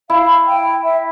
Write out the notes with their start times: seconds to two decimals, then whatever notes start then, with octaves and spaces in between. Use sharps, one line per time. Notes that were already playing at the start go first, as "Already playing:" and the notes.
0.10 E4 F5
0.47 G5
0.84 E5